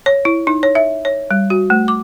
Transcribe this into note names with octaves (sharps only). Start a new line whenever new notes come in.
C#5
E4
D#4
C#5
E5
C#5
G3
F#4
A3
D6